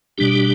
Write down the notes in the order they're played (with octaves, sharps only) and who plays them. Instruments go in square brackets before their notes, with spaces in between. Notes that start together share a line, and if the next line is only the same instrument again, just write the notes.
[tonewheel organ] B2 G3 D4 G4